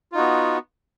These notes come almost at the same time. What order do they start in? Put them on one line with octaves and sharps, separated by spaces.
F4 D#4 F#4 B3